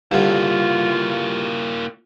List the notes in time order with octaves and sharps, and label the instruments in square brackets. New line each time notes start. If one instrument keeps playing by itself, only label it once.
[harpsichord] G2 D3 [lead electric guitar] A#3 E4 [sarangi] F4